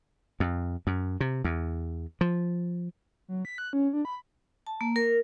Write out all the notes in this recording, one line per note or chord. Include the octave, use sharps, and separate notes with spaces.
F2
F#2
C3
E2
F3
F#3
B6
F#6
C#4
D4
B5
A5
A#3
A#4